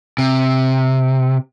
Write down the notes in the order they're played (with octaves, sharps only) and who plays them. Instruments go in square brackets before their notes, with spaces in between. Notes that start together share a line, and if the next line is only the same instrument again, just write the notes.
[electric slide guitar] C3